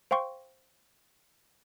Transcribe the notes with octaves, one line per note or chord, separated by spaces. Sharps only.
C5 F5 G5 C6 C#6